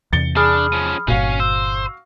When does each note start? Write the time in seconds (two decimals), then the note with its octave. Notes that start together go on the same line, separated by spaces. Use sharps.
0.13 E2 C3 A6 C#7 G7
0.37 D4 G#4 B5 D#6 F6
0.73 F3 C#4
1.08 G1 A#2 C#4 F#4 F5
1.40 C5 E6